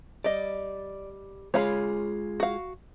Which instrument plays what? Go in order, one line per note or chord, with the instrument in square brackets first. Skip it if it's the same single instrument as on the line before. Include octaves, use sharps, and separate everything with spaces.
[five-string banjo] G3 D#5 [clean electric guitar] D5
[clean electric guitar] G#3 F4 G#4 [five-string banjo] C#5 F5 B5
[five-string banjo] F#4 F5